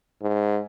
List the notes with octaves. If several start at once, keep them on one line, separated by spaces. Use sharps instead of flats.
G#2